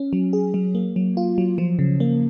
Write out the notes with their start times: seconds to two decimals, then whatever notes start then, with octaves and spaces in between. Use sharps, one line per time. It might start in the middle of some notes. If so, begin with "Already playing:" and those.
Already playing: C#4
0.13 F#3
0.33 G#4
0.54 F#3
0.75 A#3
0.96 F#3
1.17 F4
1.38 F#3
1.58 F3
1.79 C#3
2.00 A#3